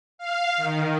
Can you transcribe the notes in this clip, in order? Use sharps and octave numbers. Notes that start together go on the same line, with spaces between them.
F5
D#3